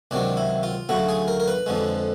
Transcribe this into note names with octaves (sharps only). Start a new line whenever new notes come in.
C#2 C3 D#3 F#3 D4
E4
F4
D2 C#3 F#3 A3 F#4
G#4
A#4
A#4
B4
F2 D3 F3 G#3